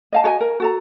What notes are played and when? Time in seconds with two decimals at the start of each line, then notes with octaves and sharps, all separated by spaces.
0.13 D#5 F5 A5
0.24 F#4 A4 D#5 G#5
0.41 A#4
0.60 F#4 A4 A#5